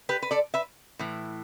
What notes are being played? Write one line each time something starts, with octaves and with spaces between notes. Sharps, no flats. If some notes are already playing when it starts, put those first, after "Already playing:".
G4 B4
B4
A4 D5
B4 E5
A2 E3